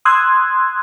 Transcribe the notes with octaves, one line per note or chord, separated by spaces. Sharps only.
C6 D#6 E6 F#6 G#6